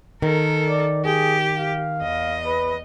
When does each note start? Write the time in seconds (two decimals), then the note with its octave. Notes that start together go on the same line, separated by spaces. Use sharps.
0.22 D#3 A4 A#4
0.69 D5
1.05 G4 G#4
1.57 F5
1.98 E2 D#5
2.46 B4